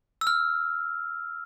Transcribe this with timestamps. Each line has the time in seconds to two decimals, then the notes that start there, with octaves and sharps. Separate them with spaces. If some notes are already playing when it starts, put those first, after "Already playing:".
0.21 E6
0.27 F6